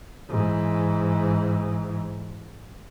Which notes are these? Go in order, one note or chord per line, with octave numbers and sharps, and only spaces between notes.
G#2 E3